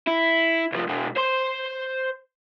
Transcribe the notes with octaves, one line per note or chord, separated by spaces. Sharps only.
E4
C2 F3
B2 G#3
C5 C6